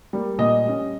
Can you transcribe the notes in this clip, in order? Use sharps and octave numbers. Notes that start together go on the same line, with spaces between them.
G3 A#3
A#2 D#5
G3 C#4